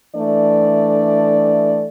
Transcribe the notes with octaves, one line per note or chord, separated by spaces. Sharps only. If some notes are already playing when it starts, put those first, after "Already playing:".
E3 A3 D4 D5